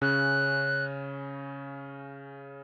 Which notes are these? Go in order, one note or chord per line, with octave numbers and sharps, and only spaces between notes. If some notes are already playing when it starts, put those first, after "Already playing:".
C#3 C#4 F#6